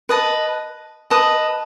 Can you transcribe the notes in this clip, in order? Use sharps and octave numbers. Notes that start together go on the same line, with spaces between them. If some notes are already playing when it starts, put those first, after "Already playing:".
B4 D#5 A5
B4 D#5 A5 D#6